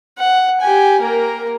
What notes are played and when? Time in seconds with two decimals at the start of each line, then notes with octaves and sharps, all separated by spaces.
0.18 F#5
0.61 G4 G#5
1.01 A#3 A#4